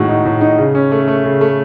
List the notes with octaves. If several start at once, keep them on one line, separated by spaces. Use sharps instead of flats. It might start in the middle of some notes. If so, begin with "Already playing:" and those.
Already playing: A2 D#3 G#3 F#4
D#4
A2
D#4
C#3
C#4
A3
A3
C#3
A3